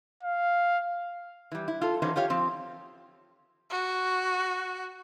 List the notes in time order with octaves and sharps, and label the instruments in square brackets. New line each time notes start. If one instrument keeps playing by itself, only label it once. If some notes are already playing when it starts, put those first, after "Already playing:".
[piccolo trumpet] F5
[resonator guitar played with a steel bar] E3 G3
E4
F4 A4
E3 F#3 C#4 D#4 B4 C5
F4 G4 C#5 F5
F3 C4
[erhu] F#4